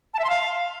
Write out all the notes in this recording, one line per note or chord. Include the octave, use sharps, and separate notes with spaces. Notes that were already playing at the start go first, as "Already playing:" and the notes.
A5
E5
C6
F5